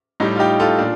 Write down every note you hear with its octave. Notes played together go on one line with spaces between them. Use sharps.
A2 G3 D#4
F4
D#4 G4
F4 A4
A#2 D4 F4